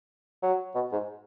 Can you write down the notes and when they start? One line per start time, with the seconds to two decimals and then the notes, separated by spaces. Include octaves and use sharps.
0.43 F#3
0.75 B2
0.92 G#2